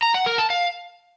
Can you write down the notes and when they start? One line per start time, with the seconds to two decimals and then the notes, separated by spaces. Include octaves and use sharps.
0.02 A#5
0.14 F#5
0.26 A#4
0.38 A5
0.50 F5